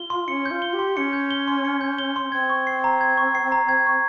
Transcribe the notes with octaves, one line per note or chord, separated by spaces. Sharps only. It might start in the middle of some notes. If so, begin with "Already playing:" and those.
Already playing: F4 G7
C6
C#4 C#7
G6
F4
G7
G4
C6
C#4 C#7
G6
G7
C6
C#7
G6
G7
C6
C4 G#6
C#6
C7
A#5
G#6
C#6
C7
A#5
G#6
C#6